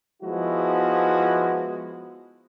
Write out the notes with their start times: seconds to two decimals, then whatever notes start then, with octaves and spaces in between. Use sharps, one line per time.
0.23 F3 G#3 B3 E4 F#4